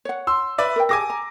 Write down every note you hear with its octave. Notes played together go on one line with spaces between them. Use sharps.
C#5 F#5
C6 E6
B4 D5 E5
A#4 G5
G4 G#4 G#5 A5 D6 A#6
A#5